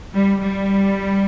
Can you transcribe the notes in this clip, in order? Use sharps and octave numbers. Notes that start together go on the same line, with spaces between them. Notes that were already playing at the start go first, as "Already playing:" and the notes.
G3
G3